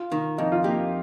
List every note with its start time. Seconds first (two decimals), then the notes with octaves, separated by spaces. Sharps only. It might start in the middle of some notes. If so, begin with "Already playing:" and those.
Already playing: F4
0.12 D#3
0.38 F2 D#4
0.52 F4
0.64 A#3 G4